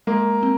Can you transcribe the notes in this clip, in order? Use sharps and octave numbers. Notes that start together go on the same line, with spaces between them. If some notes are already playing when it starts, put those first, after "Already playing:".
G#3 A#3
C4